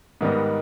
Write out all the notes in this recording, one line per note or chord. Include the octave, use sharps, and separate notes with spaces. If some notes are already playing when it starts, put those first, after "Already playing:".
G#2 D#3 G3 B3 D#4